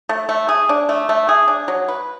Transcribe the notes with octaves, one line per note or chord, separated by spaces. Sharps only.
A3
A3
G#4
D4
A3
A3
G#4
D4
F#3
B4